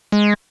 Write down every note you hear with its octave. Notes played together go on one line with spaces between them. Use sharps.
G#3